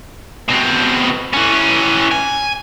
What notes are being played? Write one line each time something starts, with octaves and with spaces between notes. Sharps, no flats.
B2 C4
E3 C#4
G#5